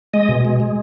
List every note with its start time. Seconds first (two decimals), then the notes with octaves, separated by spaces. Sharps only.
0.14 G#3 D#5
0.29 B2
0.45 G#3
0.60 G#3